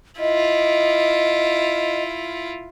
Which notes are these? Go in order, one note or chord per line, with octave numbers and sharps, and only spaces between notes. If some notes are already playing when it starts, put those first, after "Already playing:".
E4 F4 D#5